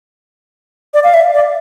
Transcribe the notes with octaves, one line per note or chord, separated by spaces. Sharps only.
D5
F5
E5
D5